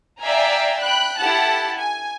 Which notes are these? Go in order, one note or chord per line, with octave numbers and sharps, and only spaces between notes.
D5 E5 F5 G5 G#5 A#5
G5 B5 F#6
E4 G4 A4 F#5 A5
G#5